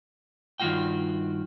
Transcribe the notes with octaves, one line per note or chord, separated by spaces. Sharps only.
G2 D#3 G3 F4 F#4 G5